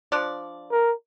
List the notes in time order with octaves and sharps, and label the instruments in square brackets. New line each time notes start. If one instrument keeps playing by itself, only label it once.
[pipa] F3 D4 D5
[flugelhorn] A#4